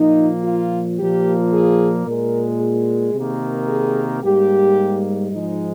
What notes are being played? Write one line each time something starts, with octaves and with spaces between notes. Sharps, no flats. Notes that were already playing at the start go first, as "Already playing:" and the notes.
Already playing: A#2 F3 A#3 D#4
F4
A#2 F3 A#3 G4
G#4
A#2 G#3 A#4
G#4
C3 D#3 A#3
G#4
G#2 G3 A#3 G4
G#2 F3 G#3 D#4